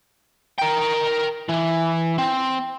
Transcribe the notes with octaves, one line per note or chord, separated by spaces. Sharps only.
A#4 G5
E3
C4